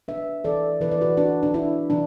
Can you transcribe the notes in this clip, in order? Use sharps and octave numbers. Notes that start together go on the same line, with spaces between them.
D4 B4 E5
E3 A4 D5
E3 B4
D5
F#4 B4
D4 F#4
D4
D4 E4
E3 D4